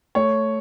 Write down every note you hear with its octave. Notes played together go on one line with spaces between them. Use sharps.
A3 C#5